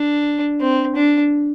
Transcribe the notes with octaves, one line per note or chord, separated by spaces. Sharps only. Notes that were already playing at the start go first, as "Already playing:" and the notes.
Already playing: D4
C4
D4